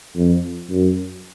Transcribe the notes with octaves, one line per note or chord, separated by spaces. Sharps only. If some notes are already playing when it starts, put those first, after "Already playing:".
F2
F#2